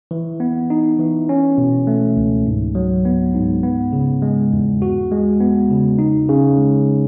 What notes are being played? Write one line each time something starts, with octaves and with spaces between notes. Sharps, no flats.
E3
B3
D#4
E3
C#4
B2
A3
C#2
G#2
F#3
B3
G#2
B3
C#3
G#3
E2
F#4
G#3
B3
C#3
D#4
C#3
G#3